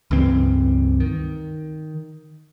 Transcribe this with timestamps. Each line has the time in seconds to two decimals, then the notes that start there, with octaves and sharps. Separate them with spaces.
0.11 C#2 G2 E3 C4
1.00 D#3